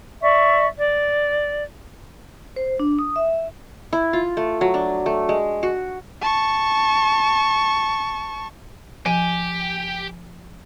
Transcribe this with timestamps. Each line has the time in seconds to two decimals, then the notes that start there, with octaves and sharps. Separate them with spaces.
0.21 D5 E5 C#6
0.78 D5
2.56 C5
2.79 D4
2.99 D#6
3.16 E5
3.93 E4
4.13 F4
4.37 A3
4.61 F#3
4.74 D4
5.06 A3
5.29 G#3
5.63 F#4
6.22 A5 C#6
9.06 F3 G4 G#5